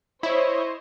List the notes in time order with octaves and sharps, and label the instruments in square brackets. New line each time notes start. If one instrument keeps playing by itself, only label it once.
[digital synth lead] E4 [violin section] C5 C#5 D#5